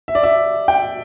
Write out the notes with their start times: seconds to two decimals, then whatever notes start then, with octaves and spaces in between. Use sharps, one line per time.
0.08 E5
0.15 D5
0.23 E5
0.68 G5